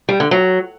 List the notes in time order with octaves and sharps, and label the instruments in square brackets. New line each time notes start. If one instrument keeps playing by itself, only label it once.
[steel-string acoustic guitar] G3
D3
F#3